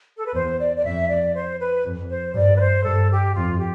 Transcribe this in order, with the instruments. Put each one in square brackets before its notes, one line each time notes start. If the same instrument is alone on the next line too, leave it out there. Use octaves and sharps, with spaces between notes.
[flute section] A4
B4
[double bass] E2 [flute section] C5
[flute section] D5
D5
[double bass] F2 [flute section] E5
[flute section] D5
C5
B4
[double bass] F2
[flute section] C5
[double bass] G2 [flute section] D5
[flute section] B4
C5
[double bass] G2 [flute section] A4
[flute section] G4
[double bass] F2 [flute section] F4
[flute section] G4